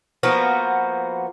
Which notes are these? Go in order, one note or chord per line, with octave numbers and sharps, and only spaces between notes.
F3 A#3 B3 F#4